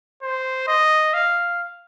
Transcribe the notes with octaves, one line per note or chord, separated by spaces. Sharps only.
C5
D#5
F5